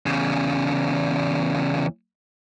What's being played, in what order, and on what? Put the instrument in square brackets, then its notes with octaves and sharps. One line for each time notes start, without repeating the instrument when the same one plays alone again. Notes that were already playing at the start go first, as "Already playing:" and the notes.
[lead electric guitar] E2 C#3